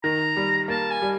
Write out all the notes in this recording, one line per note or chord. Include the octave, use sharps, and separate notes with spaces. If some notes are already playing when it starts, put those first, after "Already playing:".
D#3 A#5
G3
A#3 A5
G#5
G3